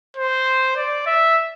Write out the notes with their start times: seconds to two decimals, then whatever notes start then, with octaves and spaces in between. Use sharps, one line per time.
0.17 C5
0.77 D5
1.06 E5